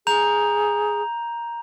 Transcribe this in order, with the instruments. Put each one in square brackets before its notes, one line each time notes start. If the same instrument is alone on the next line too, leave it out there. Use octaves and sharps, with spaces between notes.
[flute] G#4 [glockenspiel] A#5 G6 F7